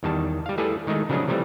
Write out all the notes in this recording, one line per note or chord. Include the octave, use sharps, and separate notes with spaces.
E2 D#3 G3 A5
G3 F5
G3 A3 E4 G#4 A4 B4
D#3 G#3 A3 D#4
C#3 F3 F#3 D4 D#4 G#4
C3 E3 F3 G3 A3